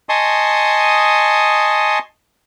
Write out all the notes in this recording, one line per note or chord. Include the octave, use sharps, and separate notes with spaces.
D#5 G#5 A5 C6 C#6 D#6